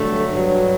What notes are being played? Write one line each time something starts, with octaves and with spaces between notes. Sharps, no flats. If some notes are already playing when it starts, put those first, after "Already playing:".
Already playing: G2 D3 F#3 A3
G2 F#3